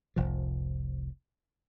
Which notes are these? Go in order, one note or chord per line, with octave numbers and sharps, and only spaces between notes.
F1 C2 F3